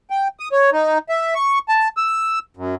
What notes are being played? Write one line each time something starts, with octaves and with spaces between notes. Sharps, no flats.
G5
D#6
C#5
D#4
E5
C#6
A5
E6
F#2